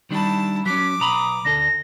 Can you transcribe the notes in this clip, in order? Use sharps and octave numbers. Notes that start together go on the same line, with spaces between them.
D#3 G3 D4 E4 A5
F#3 C#4 D6 B6
B1 A#5 B5 D#6
D2 D4 A4 A#6